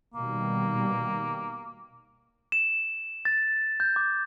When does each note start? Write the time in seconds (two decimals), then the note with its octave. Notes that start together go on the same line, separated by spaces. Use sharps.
0.14 B2 D#3 G3 A#3
2.52 E7
3.25 A6
3.80 G6
3.96 D6